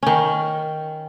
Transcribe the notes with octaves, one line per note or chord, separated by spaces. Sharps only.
D#3 C#4